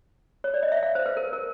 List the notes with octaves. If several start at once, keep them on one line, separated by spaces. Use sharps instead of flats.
C#5
D5
D#5
E5
F5
C5
B4
A#4
A#4